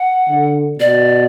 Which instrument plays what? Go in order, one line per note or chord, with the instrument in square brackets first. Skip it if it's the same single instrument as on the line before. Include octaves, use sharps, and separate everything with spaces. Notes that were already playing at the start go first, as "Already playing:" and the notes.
Already playing: [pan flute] F#5
[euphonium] D3
[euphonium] B2 [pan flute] D5